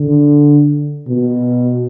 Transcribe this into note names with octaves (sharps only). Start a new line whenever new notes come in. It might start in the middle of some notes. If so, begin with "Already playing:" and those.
Already playing: D3
B2